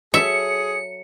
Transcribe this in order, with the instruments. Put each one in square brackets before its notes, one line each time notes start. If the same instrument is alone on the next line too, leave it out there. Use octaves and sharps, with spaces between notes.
[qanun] F#3 A4 [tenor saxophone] G#4 [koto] E5 [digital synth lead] C#7